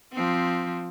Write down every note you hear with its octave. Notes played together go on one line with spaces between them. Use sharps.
F3 C4